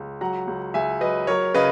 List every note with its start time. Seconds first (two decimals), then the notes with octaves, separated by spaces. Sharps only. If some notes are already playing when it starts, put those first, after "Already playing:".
Already playing: C#2
0.21 F#3 F#5 A#5
0.48 C#2
0.74 C#2 E5 G#5
1.01 F#3 B4 D#5
1.27 F#3 A#4 C#5
1.55 C#3 B4 D#5